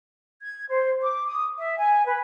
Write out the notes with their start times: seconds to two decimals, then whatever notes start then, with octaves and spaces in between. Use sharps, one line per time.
0.42 G#6
0.70 C5
1.02 D6
1.28 D#6
1.59 E5
1.78 G#5
2.06 B4